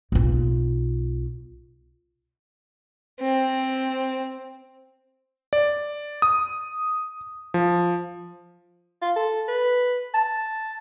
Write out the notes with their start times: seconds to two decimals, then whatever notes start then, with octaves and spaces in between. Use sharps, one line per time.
0.12 B1 F4
3.20 C4
5.53 D5
6.22 D#6
7.54 F3
9.02 F4
9.16 A4
9.48 B4
10.14 A5